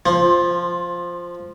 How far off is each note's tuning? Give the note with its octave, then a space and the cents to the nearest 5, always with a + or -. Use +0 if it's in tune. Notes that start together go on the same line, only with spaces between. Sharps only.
F3 +0 C5 +20